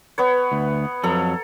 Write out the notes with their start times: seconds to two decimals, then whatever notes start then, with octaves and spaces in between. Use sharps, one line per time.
0.18 B3 B4 C#5
0.52 D2
1.04 F2 F#3 A4 A#5